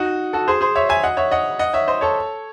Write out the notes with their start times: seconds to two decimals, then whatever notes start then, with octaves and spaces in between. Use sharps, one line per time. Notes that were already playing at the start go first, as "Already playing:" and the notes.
Already playing: D#4 F#4
0.33 F#4 A4
0.48 G#4 C5
0.61 G#4 C5
0.76 C#5 E5
0.89 E5 G#5
1.03 D#5 F#5
1.17 C#5 E5
1.31 D#5 F#5
1.59 D#5 F#5
1.73 C#5 E5
1.88 C5 D#5
2.01 A4 C#5